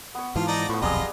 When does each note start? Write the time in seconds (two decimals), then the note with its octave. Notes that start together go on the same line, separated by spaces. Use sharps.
0.15 B3 C#5
0.36 G#2 E3 F3 F4 F5
0.48 D#4 D5 A#5
0.69 A2 F3 B3 B4 C#6
0.82 D#1 B1 F2 G3 F4 G#4 D#5 A#5